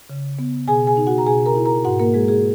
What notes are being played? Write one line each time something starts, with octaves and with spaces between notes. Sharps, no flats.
C#3
B3
B2 G#4 G#5
G#4 G#5
D#4
F#4 F#5
A#5
B2 G#4 G#5
A#4 A#5
E4
A#4 A#5
G#2 F#4 F#5
A#3 A#4
G#3 G#4
G#4